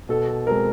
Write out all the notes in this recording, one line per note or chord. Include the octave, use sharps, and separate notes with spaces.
B2 A4
A4
G#3 C4 A#4